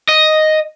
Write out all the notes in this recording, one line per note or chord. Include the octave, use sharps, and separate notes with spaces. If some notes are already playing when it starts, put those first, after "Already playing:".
D#5